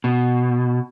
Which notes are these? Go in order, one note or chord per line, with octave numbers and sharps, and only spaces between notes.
B2